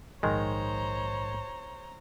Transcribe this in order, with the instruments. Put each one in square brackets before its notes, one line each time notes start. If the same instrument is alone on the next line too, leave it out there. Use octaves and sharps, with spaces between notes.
[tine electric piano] A#1 G#2 [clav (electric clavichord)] D#3 G#3 [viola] C5 C#5 [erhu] A#5